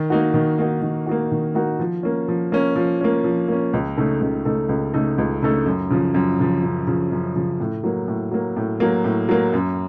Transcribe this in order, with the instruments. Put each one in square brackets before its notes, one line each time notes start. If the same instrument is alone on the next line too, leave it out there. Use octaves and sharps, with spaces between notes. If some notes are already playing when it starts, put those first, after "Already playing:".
Already playing: [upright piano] D#3
A#3 D#4 F#4
D#3
A#3 D#4 F#4
D#3
A#3 D#4 F#4
D#3
A#3 D#4 F#4
F3
A#3 C#4
F3
A#3 C#4
F3
A#3 C#4
F3
A#3 C#4
C#2
C#3 A3 D#4 A4
C#2
C#3 A3 D#4 A4
C#2
C#3 A3 D#4 A4
C#2
C#3 A3 D#4 A4
F#2
C#3 F3
F#2
C#3 F3
F#2
C#3 F3
F#2
C#3 F3
A2
F#3 A#3
A2
F#3 A#3
A2
F#3 A#3
A2
F#3 A#3
F#2